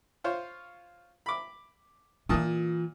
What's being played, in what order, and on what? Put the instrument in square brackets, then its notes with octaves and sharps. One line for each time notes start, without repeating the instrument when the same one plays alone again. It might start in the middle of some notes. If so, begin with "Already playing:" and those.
[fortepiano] F4 C5 C#5
B5 D6
[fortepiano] A#2 A5 D#6 [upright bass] E3 F4